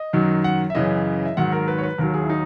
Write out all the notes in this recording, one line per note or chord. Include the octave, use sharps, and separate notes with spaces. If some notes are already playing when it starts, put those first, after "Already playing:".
Already playing: D#5
F#2 D#3 F#3
F#5
E5
F#2 C#3 E3 D#5
E5
G#2 D#3 F#3 F#5
A#4
B4
C#5
B4
D#2 D#3 F#3 A#4
G#4
E4
D#4